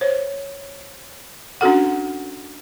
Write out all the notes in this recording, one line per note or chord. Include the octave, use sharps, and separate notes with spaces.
C5 C#5
C#4 D4 F#4 A4 F#5